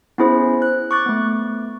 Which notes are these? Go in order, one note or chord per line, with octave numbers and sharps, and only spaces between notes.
B3 C#4 E4 G#4 C5
F#6
C#6 D6 F#6 A6
A3 B3